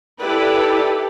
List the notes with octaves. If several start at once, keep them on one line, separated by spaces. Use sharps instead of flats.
E4 G4 A4 B4 D5